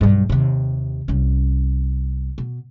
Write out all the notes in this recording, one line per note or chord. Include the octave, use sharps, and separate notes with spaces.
B1 G2
D#2 C3
C2 C#4
B2